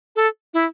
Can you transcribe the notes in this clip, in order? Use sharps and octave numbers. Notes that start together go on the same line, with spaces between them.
A4
E4